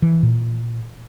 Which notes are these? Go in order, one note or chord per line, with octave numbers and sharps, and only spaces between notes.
E3
A#2